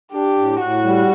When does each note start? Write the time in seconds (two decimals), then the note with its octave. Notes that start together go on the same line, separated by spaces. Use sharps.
0.13 D4 G4
0.38 A2
0.61 A2 F#4
0.84 G3